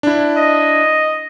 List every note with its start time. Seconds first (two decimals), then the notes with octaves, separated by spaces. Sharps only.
0.03 D4 E4
0.37 D#5